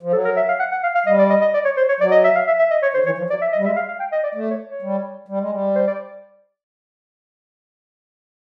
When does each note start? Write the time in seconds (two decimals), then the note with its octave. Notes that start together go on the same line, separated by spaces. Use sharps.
0.03 F3
0.12 F#3 A4
0.25 A#4
0.36 E5
0.49 F5
0.60 F#5
0.71 F#5
0.83 F5
0.95 F5
1.06 G3 D#5
1.19 D5
1.30 D#5
1.41 D#5
1.54 D5
1.65 C#5
1.77 C5
1.89 C#5
2.00 F#3 D5
2.12 D#5
2.24 E5
2.35 F5
2.47 E5
2.59 E5
2.71 D#5
2.83 C#5
2.94 D3 C5
3.06 E3 C#5
3.18 F3
3.30 F#3 D5
3.42 E5
3.52 D#5
3.58 G3
3.65 G#3 E5
3.76 F5
3.88 F5
4.00 G5
4.12 D#5
4.24 D5
4.35 A3 D5
4.51 C#5
4.67 C#5
4.82 G3
5.28 G3
5.40 G#3
5.50 G3
5.76 C5
5.87 D5